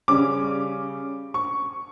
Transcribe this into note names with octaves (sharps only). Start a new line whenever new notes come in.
C#3 G3 C#4 D6
C#6